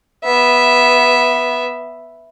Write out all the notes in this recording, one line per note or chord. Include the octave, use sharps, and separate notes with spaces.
B3 E5